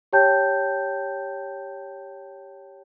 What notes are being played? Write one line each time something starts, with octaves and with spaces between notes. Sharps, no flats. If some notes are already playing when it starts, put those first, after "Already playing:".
G4 C#5 G5 A5 G6